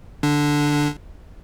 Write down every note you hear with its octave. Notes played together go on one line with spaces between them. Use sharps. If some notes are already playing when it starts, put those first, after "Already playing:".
D3 D4